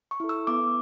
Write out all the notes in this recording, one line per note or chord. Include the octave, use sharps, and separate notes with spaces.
C#6
E4 A4
E6
B3 D6